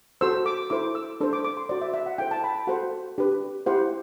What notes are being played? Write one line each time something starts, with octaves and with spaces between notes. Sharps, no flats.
F#4 A4 C5 E6
D6
E4 A4 C5 D6
E6
D4 A4 C5
D6
D6
C6
F#4 C5 D5
E5
E5
F#5
E4 A4 C5 G5
A5
B5
A5
F#4 A4 C5 F#5
D4 G4 B4
E4 G4 C5 F#5